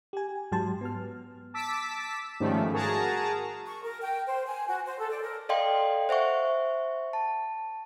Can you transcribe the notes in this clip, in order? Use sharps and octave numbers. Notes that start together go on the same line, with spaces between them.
G4 G#5
G#2 F#3 G4 A5 C6
B3 F6
A5 D6 E6 B6
G#2 D#3 F3 G3 A3 C#4
F#4 G#4 A#4 A5 A#5
C#6
A#4
G5
C5
G#5
F#4
C5
A4
D5
A#4
A4 D5 D#5 F5 G5 C6
C5 E5 F#5 C#6
A5